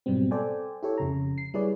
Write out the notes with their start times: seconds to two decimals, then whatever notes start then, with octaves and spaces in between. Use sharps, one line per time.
0.06 G#2 B2 F#3 G3 C4
0.31 A4 C5 D5 G5 G#5
0.83 E4 G4 A4 C#5
0.98 F2 C#3 A#5
1.38 C7
1.54 G3 E4 G#4 B4 C#5 D5